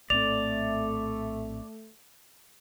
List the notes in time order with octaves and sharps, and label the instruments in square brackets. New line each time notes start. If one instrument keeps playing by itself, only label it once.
[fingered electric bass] A#1 A2 C4 [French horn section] A3 [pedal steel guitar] D5 [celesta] F7